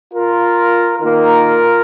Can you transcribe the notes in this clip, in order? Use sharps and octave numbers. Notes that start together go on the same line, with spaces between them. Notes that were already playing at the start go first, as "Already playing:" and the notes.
F4 A#4
D#3 A#3 F4 A#4